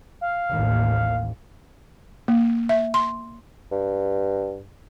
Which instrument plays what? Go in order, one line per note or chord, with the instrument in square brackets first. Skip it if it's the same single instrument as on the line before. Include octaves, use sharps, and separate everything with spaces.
[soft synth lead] F5
[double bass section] A1 D#2
[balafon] A#3
E5
C6
[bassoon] G2